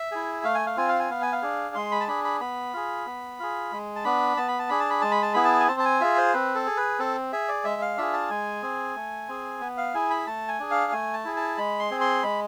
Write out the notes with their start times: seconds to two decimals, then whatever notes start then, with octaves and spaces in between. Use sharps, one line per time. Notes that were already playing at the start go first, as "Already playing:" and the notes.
Already playing: E5
0.12 E4 G#4
0.44 A3 F5
0.55 G#5
0.67 F5
0.77 C4 F4 G#5
0.89 F5
0.99 G#5
1.10 B3 F5
1.22 G#5
1.32 F5
1.42 D4 G#4
1.75 G#3 C6
1.92 B5
2.01 A5
2.08 D4 G#4 B5
2.24 B5
2.40 B3 B5
2.74 F4 G#4
3.06 B3
3.40 F4 G#4
3.72 G#3
3.96 A5
4.05 B3 D4 B5
4.37 B3 A5
4.48 B5
4.59 A5
4.69 D4 G#4 B5
4.80 A5
4.90 B5
5.01 G#3 A5
5.11 B5
5.22 A5
5.34 B3 E4 G#4 B5
5.44 A5
5.60 G#5
5.68 C4 A5
5.80 A5
5.85 G#5
6.01 F4 G#4 E5
6.18 C5
6.33 C4 B4
6.55 A4
6.67 G#4
6.77 B4
6.99 C4 A4
7.33 G#4 E5
7.48 D5
7.64 G#3 E5
7.82 F5
7.97 D4 F4 G#4 E5
8.13 A5
8.30 G#3 G#5
8.63 C4 G#4
8.95 A3
9.28 C4 G#4
9.61 B3
9.78 F5
9.94 E4 G#4 G#5
10.10 B5
10.26 A3 A5
10.48 G#5
10.60 D4 G#4
10.71 F5
10.92 A3 G#5
11.13 A5
11.25 E4 G#4
11.37 A5
11.57 G#3 B5
11.80 C6
11.91 C4 G#4
12.01 C6
12.23 G#3 B5